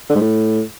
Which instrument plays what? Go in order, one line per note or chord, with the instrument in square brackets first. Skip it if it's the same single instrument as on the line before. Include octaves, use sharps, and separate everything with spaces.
[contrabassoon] D3
G#2
A2